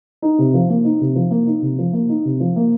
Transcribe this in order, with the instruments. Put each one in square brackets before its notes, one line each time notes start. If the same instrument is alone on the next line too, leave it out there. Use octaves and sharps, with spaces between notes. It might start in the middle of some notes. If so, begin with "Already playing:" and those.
[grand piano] D#4
C3
F3
A#3
D#4
C3
F3
A#3
D#4
C3
F3
A#3
D#4
C3
F3
A#3